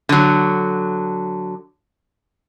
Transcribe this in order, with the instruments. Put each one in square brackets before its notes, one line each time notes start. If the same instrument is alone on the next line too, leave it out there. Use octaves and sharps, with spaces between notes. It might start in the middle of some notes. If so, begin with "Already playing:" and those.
[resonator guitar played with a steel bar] D3 F#3